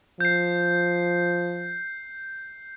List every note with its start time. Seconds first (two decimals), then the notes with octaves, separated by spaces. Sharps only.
0.20 F3 G6 C7